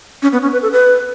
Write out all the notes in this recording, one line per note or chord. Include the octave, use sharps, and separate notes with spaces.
C#4
B3
C#4
B4
A4
B4